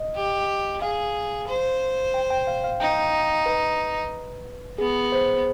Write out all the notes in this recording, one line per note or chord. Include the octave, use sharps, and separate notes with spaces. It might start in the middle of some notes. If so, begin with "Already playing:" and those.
Already playing: D#5
G4
G#4 F5
C5
G5
G5
F5
F5
D#4 G5
B4
B3 G#4
C5